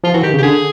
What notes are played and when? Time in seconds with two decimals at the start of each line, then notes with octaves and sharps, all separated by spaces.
0.04 F3 F4
0.14 E3 F#4
0.23 D#3 G4
0.34 C#3
0.38 G4
0.43 D3 G#4